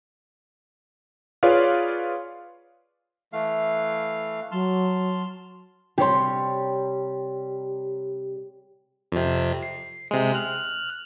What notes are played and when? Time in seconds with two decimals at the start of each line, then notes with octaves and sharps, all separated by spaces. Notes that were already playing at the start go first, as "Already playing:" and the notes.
1.43 F4 G#4 B4 C#5 D5 F5
3.33 E3 A3 F5
4.52 F#3 A5 C6 F6
5.98 C3 G3 G4 C#5 C6
9.12 F2 C3
9.63 C7
10.11 C3 G#3
10.34 F6 F#6